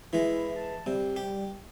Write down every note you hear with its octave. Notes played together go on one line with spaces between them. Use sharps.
E3 G#3 E4
A5
C3 G3
G4